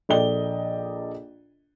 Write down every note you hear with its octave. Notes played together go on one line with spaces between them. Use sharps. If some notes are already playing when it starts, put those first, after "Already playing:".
A#1 A4 D5 D#5 G5 G7